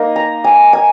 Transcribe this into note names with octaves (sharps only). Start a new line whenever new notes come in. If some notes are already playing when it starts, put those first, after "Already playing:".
Already playing: A#3 D#4
A#5
G#5
G#5